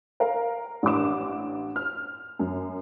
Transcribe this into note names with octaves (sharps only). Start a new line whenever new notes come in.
A#4 F5
A1 D4 D6 E7
F6
F#2